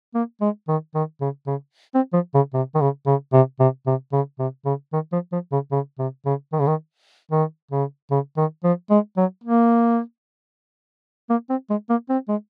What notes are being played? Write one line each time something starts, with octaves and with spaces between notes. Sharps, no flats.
A#3
G#3
D#3
D#3
C#3
C#3
C4
F3
C#3
C3
D#3
C#3
C#3
C3
C3
C3
C#3
C3
C#3
D#3
F3
F3
C#3
C#3
C3
C#3
D#3
C#3
D#3
D#3
C#3
C#3
D#3
F3
G#3
F#3
A#3
A#3
C4
G#3
A#3
C4
G#3